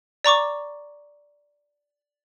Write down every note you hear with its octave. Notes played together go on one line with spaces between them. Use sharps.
D5 A#5 C#6 D6